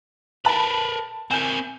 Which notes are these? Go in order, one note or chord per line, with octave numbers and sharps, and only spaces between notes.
A#4 B4 A5 B5
C4 A#4 G#5 G6